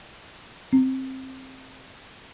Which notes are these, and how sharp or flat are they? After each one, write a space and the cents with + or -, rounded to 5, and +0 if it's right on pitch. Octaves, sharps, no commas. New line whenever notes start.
C4 +10